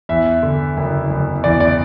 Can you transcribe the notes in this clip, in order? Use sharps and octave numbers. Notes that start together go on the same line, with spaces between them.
E2 E5
D3
F#1
F#1
E2 D5
D5